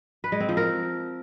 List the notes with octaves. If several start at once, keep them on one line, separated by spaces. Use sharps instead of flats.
B4
G#3
C4
F3
A#4